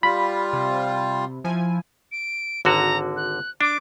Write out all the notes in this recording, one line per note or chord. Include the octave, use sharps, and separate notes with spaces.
G3 F4 B5
C3
F3 E4 G#5
D7
G#1 D3 F#4 A#5
F#6
D4 D6